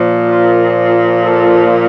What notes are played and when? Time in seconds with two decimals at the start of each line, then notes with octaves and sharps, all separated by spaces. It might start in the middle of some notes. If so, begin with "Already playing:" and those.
Already playing: A#2 F3
0.28 F4
1.22 A4